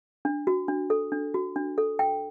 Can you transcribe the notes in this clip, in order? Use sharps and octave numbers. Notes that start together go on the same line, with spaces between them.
D4
F#4
D4
A4
D4
F#4
D4
A4
G5